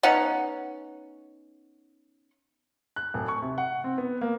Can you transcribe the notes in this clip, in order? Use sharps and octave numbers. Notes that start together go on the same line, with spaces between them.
B3 C#4 D#4 F#5
F#6
D1
C#6
C3
F#5
C4
B3
A#3